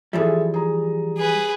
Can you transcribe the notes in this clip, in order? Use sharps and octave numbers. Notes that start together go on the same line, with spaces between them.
E3 F3 G3 G#4 A4 E5
G#4 A#5
G#4 B4